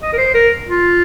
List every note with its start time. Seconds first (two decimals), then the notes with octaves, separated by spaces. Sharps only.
0.02 D#5
0.13 A#4
0.18 C5
0.35 A#4
0.68 F4